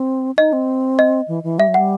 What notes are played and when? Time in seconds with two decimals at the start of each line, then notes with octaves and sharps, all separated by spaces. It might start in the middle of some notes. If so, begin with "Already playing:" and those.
Already playing: C4
0.37 D#4 D#5
0.53 C4
0.99 D#5
1.28 E3
1.44 E3
1.58 G3 E5
1.68 F#3
1.74 G3 F#5